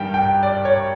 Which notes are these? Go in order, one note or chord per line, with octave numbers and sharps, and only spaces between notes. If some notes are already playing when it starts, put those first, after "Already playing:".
Already playing: G2 D#3 G3 G5
G5
D5
C#5